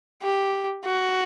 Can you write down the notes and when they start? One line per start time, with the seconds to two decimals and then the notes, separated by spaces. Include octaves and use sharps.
0.22 G4
0.85 F#4